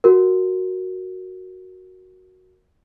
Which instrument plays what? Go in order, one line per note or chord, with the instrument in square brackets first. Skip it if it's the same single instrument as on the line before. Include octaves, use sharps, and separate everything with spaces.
[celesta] F#4 A#4